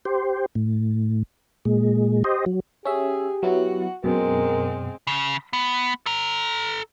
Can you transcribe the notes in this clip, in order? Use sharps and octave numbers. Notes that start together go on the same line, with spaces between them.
G4 C5
A2
A#2 G#3
G4 C5 D#5
F#3
C#4 G4 G#4 E5
F#3 B3 E4 F#4 F#5
F#2 B2 G#3 C4 A#4
C#3
B3
A4 A#5